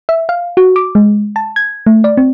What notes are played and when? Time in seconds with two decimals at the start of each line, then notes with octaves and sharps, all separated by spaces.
0.09 E5
0.29 F5
0.57 F#4
0.76 D6
0.95 G#3
1.36 A5
1.56 G#6
1.86 A3
2.04 D5
2.17 C4